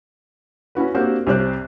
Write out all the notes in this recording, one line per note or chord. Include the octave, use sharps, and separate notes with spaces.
C#4 E4 F#4 B4
A#3 C4 D4 F#4 G4 C5
C2 C3 C5 D5 F#6